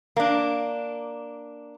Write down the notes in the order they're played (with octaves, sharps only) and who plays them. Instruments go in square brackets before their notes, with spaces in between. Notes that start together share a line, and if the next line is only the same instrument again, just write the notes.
[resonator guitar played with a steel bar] A#3 D4